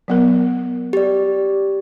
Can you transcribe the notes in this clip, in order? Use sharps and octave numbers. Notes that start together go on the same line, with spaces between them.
F#3 B3 A#4
G4 D5